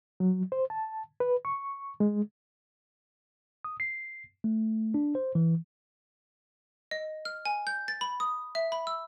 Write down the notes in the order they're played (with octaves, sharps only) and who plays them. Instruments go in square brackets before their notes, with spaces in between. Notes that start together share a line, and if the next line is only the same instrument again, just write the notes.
[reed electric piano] F#3
C5
A5
B4
C#6
G#3
[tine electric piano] D#6
C7
A3
D4
C5
E3
[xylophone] D#5
F6
G#5
G6
A6
B5
D#6
E5
B5
E6